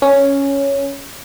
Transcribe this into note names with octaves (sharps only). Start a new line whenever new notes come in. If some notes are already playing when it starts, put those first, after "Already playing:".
C#4